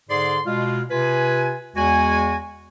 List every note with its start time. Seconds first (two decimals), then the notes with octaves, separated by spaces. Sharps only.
0.10 G#2 D3 G#4 D5 C6
0.46 B2 G#3 F4
0.90 C3 F4 B4 G#5
1.76 E2 G#3 F#4 G#5